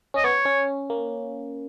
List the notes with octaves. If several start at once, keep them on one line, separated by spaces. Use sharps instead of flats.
C#4 D#5
B3 C#5
C#4
A#3